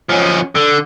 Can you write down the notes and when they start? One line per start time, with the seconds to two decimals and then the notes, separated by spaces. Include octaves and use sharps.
0.10 F3 C#4
0.56 D3